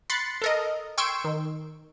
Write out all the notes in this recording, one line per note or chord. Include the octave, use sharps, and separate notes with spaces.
B5 C6 F#6 A6 C#7
A4 A#4 D#5
G5 C6 C#6 E6 G#6 D7
D#3